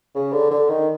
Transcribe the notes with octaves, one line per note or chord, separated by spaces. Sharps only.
C#3
D3
D3
D#3